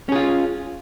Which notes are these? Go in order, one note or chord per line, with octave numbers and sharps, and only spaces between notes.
C#4 F4 G#4